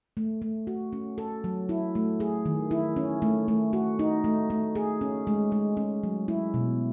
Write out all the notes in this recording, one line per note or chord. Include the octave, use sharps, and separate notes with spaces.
A3
A3
F#4
C#4
A4
F#3
E4
A3
G#4
D#3
E4
C#4
A3
A3
F#4
D#4
A3
A3
G#4
C#4
G#3
G#3
C#4
F#3
E4
B2